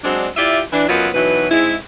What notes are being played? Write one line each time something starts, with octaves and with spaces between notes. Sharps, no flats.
F#3 G#3 C4 D4
E4 F4 G4 D5 E5
E3 D4
F#2 F#3 B3 F4 D#5
B2 E3 F#3 D#4 B4
G#2 G#3 C4 E4